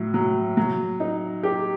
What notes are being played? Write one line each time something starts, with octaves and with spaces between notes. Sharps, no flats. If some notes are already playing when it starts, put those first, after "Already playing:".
Already playing: A2 F#3
F#3
F#3
D#4
G4